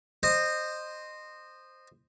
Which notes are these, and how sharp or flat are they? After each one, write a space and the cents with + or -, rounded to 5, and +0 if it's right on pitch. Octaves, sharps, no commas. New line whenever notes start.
C5 +0 D#5 -20